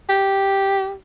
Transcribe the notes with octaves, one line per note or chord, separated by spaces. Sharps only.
G4